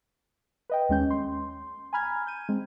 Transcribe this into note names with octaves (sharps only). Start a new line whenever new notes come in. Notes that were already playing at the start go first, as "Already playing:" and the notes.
B4 D#5 G5
D#2 G#3 C#4 G6
C6
G#5 A#5 B5 F6 G#6
G6 G#6 D#7
G#3 C4